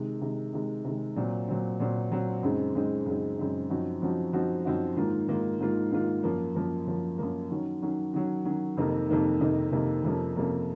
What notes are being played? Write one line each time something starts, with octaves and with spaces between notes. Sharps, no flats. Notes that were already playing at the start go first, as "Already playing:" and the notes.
Already playing: C3 D#3 G#3
C3 D#3 G#3
C3 D#3 G#3
C3 D#3 G#3
A#2 F#3 C4
A#2 F#3 C4
A#2 F#3 C4
A#2 F#3 C4
F#2 C#3 G#3 C4 D#4
F#2 C#3 G#3 C4 D#4
F#2 C#3 G#3 C4 D#4
F#2 C#3 G#3 C4 D#4
F#2 F3 C4 D#4 F#4
F#2 F3 C4 D#4 F#4
F#2 F3 C4 D#4 F#4
F#2 F3 C4 D#4 F#4
G#2 D#3 A#3 F4
G#2 D#3 A#3 F4
G#2 D#3 A#3 F4
G#2 D#3 A#3 F4
F#2 F3 A#3
F#2 F3 A#3
F#2 F3 A#3
F#2 F3 A#3
D#3 F#3 C#4
D#3 F#3 C#4
D#3 F#3 C#4
D#3 F#3 C#4
F2 C3 D#3 A#3 D#4
F2 C3 D#3 A#3 D#4
F2 C3 D#3 A#3 D#4
F2 C3 D#3 A#3 D#4
F2 C3 F3 A#3 C#4
F2 C3 F3 A#3 C#4